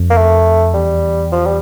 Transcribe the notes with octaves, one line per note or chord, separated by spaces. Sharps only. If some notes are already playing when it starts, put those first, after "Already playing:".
Already playing: F2
A#3
A3
E2 G3
F3
G3